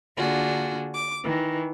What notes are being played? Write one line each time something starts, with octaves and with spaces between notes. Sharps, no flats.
D3 A#3 D4 F4 F#4 G#4
D6
D#3 E3